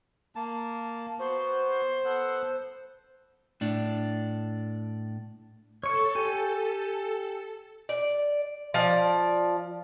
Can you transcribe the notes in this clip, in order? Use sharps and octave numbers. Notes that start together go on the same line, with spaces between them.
A#3 A5
B3 F#4 C5
B3 A4 F#5
A2 D4
A4 C#5 C#6
G4 G#5
D5
F3 D5